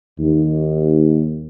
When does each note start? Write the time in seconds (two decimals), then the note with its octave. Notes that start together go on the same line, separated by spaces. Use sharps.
0.19 D#2